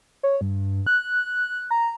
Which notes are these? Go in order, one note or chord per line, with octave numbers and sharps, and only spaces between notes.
C#5
G2
F#6
A#5